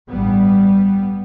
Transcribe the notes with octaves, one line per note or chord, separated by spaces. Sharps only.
A1 G2 G3 B3